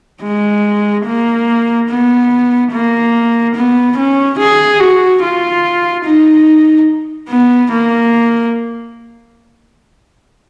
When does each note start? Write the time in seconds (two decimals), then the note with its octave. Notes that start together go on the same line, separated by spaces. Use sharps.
0.22 G#3
1.06 A#3
1.89 B3
2.72 A#3
3.55 B3
3.97 C#4
4.39 G#4
4.80 F#4
5.22 F4
6.05 D#4
7.29 B3
7.72 A#3